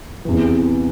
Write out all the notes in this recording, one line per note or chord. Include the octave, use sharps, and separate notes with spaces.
E2 C3 E3